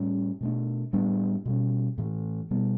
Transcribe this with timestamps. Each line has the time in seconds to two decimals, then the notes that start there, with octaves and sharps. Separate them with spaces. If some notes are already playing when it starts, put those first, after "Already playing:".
Already playing: A2 G3 C#4
0.41 B2 A3 D4
0.93 A2 G3 B3 D4
1.46 B2 G3 C#4
1.98 A2 E3 A3
2.51 B2 G3 B3